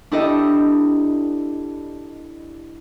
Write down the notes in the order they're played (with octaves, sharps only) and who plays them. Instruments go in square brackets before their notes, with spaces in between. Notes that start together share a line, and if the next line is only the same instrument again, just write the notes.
[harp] D4 E4 G4 A4 D#5